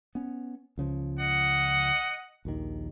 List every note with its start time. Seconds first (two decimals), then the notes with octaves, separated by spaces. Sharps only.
0.15 B3 C#4
0.78 C#2 C#3 F3
1.17 D#5 F#5
2.45 A#1 D#2 D#3